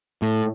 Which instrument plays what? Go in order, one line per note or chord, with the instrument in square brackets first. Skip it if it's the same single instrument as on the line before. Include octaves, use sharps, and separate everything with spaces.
[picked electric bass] A2